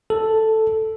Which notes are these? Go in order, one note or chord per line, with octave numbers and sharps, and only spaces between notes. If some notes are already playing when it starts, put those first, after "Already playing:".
A4